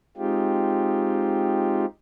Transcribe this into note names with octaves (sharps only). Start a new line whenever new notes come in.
G#3 C4 D#4 F4 G4